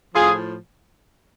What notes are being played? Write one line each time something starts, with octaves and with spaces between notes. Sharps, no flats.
A2 F3 F4 G#4